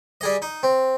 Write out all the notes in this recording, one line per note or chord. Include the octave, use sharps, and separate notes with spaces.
G3 G#4 D#5
D#4
C4